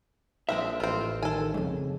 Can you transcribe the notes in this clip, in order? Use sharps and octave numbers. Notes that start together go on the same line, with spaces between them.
A#1 F3 G#3 C4 E5
A1 C4 F4
D#3 A4 G#5
B1 F2 C#3